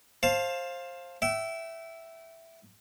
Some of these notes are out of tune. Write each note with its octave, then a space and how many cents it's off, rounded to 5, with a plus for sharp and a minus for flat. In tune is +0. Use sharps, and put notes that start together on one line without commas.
C5 +20 F5 +0 A5 +0
E5 +0 G5 -35